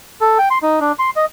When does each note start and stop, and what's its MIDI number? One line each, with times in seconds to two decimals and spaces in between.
0.21 0.38 69
0.38 0.49 79
0.50 0.58 84
0.62 0.80 63
0.80 0.92 62
0.99 1.10 84
1.16 1.25 75